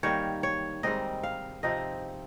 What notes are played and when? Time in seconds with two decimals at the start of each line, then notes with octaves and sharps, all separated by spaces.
0.03 D#3 G3 A#3 C#5
0.43 C#5
0.83 G#2 G3 C4 D#4 D#5
1.23 F5
1.63 C3 F3 C4 D#4 D#5